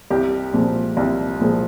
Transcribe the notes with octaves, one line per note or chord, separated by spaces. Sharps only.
C2 G4
A#2 F3 G#3
C2
A#2 F3 G#3